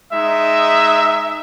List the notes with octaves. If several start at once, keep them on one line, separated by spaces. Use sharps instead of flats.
G#3 D#4 E5